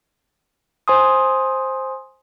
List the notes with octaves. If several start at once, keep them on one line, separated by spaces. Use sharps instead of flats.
C5 G#5 C6 D#6